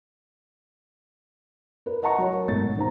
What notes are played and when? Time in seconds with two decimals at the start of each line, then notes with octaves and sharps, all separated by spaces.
1.86 A#4 B4
2.03 D#5 F#5 A5 A#5 C#6
2.18 F#3 C#5
2.33 A#4 F#5
2.48 G#1 B2 A3 A6
2.77 D#3 C5 A#5